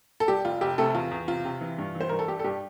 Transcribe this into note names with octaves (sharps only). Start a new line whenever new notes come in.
A4
G3 G4
F1 F4
F1 G4
C3 A3 A4
E2 F4
E2
C3 F4
C3
E3
G2
E3
C5
G2 A#4
A4
G3 G4
A4
G2 G4